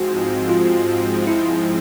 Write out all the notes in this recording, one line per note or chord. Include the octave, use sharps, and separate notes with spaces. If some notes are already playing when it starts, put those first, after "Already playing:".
Already playing: G#2 F3 G#3 C4 F#4
F4
E4